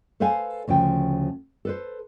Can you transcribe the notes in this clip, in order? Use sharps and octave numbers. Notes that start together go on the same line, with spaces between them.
A4 B4 C5 F5 G#5
D2 C#3 F3 G5
A4 B4 C5